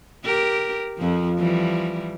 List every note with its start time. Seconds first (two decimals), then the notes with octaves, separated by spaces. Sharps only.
0.25 G4 A#4
0.98 F2 F3
1.38 E3 F3 G3